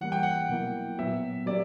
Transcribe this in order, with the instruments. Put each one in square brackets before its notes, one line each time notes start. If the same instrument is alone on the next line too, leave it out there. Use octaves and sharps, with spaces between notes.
[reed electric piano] E3 G3 A#3 [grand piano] F#5
[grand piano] G5
F#5
[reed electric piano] B2 F#3 A#3 E4
[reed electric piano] A#2 F#3 B3 F#4 [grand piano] E5
[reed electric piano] F#3 A#3 C#4 G4 [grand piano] D5